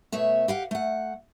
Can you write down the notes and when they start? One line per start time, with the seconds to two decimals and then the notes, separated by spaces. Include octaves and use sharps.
0.12 B2 A3 C#5 E5
0.48 G4 F5 F#5
0.71 A3 F#5